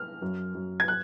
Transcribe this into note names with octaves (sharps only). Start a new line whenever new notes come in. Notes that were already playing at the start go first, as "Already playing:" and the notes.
Already playing: F6
F#2
F#2
G#6
F#6